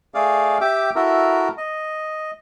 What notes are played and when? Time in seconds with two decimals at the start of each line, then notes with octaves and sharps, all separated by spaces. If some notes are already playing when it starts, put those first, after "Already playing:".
0.14 A3 G#4 D5 F5
0.61 G4 E5 G5 D6
0.96 E4 F#4 A4 A#4 E5 A#5
1.58 D#5